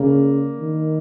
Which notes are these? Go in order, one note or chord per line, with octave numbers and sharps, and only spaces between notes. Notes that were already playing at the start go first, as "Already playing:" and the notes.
Already playing: C#3 G3 A#3
D#3